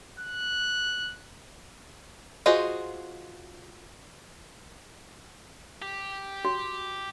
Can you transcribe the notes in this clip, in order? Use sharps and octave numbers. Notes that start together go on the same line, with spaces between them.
F#6
F4 F#4 G#4 C5 D#5
G4
F#4